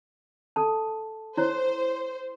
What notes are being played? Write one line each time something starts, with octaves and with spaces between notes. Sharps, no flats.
A4 A5
E4 C5 C#5